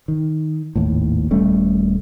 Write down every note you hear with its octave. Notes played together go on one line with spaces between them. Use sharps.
D#3
G#1 D#2 A2
D#1 G3 A3 C#4